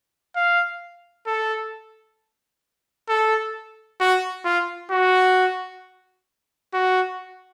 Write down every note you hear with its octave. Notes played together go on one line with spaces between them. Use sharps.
F5
A4
A4
F#4
F4
F#4
F#4